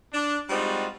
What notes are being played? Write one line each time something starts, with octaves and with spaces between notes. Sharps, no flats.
D4
G3 G#3 C4 D#4 F4 F#4